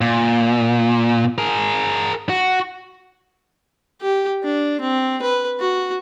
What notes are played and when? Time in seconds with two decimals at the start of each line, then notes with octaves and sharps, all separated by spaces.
0.01 A#2
1.38 G#4 A#4
2.29 F#4
4.02 G4
4.44 D4
4.81 C4
5.22 B4
5.60 F#4